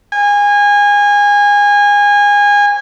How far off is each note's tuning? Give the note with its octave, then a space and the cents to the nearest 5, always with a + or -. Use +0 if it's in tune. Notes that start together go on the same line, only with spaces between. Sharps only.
G#5 -25